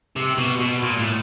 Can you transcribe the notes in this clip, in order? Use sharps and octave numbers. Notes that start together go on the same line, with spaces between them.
C3
B2
B2
A#2
A2